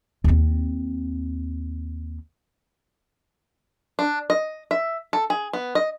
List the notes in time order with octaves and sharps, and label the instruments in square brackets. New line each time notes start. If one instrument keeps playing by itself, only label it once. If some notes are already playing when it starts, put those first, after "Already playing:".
[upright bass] D#2 C4
[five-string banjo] D4
D#5
E5
A4
G#4
B3
D#5